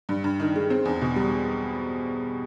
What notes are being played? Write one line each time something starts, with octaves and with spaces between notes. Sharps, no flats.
G2
G2
D#3
G#3
C4
E2
B2
G3